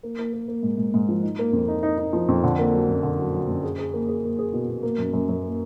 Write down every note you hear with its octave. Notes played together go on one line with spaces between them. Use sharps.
A#3
A#3
A#3
A#3
G#2
G#2
G#2
F3
D#4
A#3
F2
D#4
D#4
D#4
F3
F2
D3
A#3
F#3
F#2
D3
F#3
F#3
F#2
G#4
G#4
A#3
G#4
A#3
G#4
B2
B2
A#3
F#2
F#2
F#2
A#3